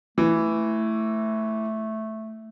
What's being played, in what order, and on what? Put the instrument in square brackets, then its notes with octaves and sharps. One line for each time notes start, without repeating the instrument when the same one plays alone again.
[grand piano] E3 [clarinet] A3